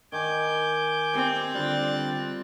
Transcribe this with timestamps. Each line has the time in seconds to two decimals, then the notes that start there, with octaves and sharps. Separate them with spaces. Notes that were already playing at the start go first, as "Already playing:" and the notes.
0.12 D#3 G#5 D6 G6
1.14 C4 G4
1.54 D3 G3 F4 C6 F#6 A6